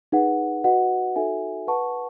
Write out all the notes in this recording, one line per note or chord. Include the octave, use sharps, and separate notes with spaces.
D#4 G#4 B4 F#5
F#4 B4 D#5 F#5
D#4 F#4 A4 E5 G#5
B4 F#5 A5 C#6